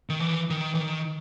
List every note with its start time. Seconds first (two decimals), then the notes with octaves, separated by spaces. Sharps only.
0.09 D#3
0.20 E3
0.50 D#3
0.75 E3
0.80 D#3